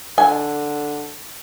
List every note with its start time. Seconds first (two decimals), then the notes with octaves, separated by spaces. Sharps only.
0.18 D3 G#5